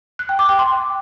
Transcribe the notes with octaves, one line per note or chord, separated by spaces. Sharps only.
F#6
G5
D6
G5
C6